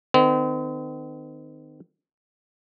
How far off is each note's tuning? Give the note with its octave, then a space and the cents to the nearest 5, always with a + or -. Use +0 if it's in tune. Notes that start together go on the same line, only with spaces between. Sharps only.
D#3 -25 C4 -40